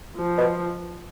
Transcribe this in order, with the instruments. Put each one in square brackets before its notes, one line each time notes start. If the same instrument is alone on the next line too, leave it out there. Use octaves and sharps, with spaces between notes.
[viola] F3
[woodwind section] B2